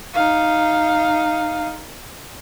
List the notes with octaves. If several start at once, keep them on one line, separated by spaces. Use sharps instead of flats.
D#4 F5